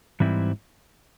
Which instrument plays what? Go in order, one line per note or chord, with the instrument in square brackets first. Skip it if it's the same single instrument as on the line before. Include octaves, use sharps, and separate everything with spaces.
[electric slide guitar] G#2 E3 G3 C4 E4